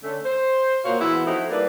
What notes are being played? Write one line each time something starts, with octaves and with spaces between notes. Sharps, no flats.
D3 A3 C#4
C5
A#2 F#4 A#4 C5 C#5 F5
E3 G#3 B3 E4 F#4
F3 A3 C4 D#4 E4 F#4
G3 A#3 D4 E4 B4 D5